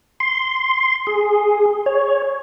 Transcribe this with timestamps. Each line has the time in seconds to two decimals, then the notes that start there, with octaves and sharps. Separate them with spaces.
0.20 C6
1.07 G#4
1.86 C#5